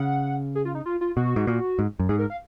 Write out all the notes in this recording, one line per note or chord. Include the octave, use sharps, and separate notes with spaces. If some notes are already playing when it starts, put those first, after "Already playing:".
Already playing: C#3 F#5
G#4
F4
D#4
F4
F4
B2 F#4
G#2
A#2
G#2
F#2
G#2 G#4
A#4
F5